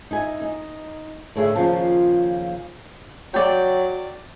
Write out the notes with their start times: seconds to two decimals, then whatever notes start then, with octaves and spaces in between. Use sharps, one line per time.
0.11 D#4 E4 G#5
0.42 D#4
1.35 A2 D3 G#4 B4 E5
1.55 D#2 C#3 F3 F4 A5
3.34 F#3 D5 G5